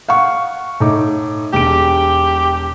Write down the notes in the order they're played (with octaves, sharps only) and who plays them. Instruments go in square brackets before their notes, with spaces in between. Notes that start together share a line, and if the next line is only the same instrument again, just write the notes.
[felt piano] F5 F#5 C#6
A2 D#4 D6
[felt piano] E1 D7 [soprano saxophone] G4